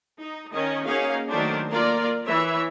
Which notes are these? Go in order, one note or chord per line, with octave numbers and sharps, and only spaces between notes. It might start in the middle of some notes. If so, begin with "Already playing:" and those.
D#4
D#3 C#4 D#5
A#3 C#4 D#4 F#4 G#4 F5
D#3 F#3 A3 D4 D#4 C5
A#3 F4 A#4 D5
E3 C#5 E5